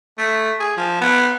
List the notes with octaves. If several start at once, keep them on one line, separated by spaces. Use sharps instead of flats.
A3
G#4
F3
B3